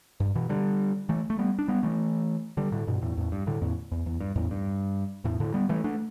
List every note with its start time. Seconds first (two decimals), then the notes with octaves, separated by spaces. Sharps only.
0.20 G2
0.35 B2 E3
0.49 D3 G3
1.09 E3 A3
1.30 A3
1.39 G3 B3
1.59 D4
1.68 G3 B3
1.83 E3 A3
2.57 D3 G3
2.72 A2 D3
2.87 G2 B2
3.02 E2 A2
3.17 E2 A2
3.32 G2
3.47 A2 D3
3.61 E2 A2
3.92 E2
4.06 E2
4.20 G2
4.36 E2 A2
4.51 G2
5.24 E2 A2
5.40 A2 D3
5.54 G3 B3
5.69 E3 A3
5.84 A3 D4